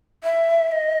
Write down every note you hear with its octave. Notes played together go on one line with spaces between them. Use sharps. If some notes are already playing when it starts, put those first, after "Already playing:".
E5
E5
D#5